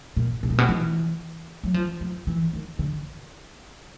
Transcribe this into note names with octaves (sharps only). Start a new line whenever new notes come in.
A#2
B2
A#2
B2
E3
F#3
F3
F3
E3
D#3
D3